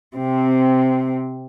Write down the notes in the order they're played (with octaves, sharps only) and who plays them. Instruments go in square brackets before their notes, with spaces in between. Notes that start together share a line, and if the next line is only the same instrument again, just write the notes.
[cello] C3 C4